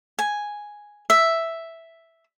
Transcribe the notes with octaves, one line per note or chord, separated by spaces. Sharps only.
G#5
E5